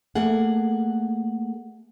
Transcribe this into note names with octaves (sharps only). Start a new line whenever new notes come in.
A3 A#3 G#4 F#5